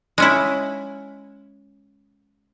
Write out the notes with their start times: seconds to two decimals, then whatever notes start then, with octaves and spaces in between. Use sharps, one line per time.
0.18 G#3 C#4 E4